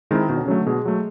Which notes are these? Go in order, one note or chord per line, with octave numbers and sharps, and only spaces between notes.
D#3 G#3 C4 E4
B2 D#3
D3
C#3
D3 F#3 A3
B2 G#3
F#3 A3